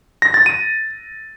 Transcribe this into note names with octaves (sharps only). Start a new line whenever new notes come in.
A#6
A6
D#7